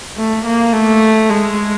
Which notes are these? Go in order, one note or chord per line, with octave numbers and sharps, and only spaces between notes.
A3
A#3
A3
G#3